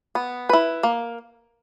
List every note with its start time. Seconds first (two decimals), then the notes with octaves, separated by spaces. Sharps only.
0.15 B3
0.49 E4 B4
0.83 A#3